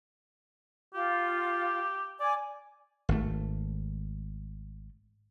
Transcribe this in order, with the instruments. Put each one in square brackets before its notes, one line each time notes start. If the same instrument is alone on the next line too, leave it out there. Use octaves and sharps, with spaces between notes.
[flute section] F4 [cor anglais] G4
[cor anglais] D5 [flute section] G#5 D6
[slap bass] G#1 A3